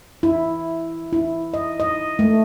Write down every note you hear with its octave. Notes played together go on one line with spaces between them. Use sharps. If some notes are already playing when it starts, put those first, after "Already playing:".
E4
E4
D#5
D#5
A3